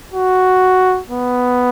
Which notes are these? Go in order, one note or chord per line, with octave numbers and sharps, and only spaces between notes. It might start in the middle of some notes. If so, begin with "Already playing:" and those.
F#4
B3